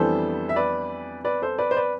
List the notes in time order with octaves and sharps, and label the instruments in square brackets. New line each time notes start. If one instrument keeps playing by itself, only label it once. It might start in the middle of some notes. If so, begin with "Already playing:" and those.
Already playing: [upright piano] F2 E3 G3 B3 D4 A4 C5
E5
B4 D5
B4 D5
A4 C5
B4 D5
C5
B4 D5